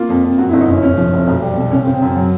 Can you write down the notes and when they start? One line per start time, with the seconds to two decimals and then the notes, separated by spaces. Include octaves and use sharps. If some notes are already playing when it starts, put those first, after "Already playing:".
Already playing: A#3 F4
0.09 F2
0.23 F2
0.38 F#2 F#4
0.49 E4
0.53 G1
0.61 D#4
0.67 G1 C#4
0.82 F1 C#4
0.97 F3
1.13 F1
1.27 B1
1.42 G3
1.57 B2
1.71 C#3 C#4
1.82 C4
1.87 C#3
1.94 C4
2.02 F#2 C#4
2.16 F#3